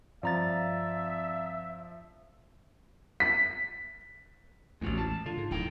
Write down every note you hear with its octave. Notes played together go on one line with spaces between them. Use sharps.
G2 F3 C4 D5 E5 F5 A#5 A6
B6
A1 E2 G#3 F#4
A5
D3 F4
G#2
D1 A2 D#4 G5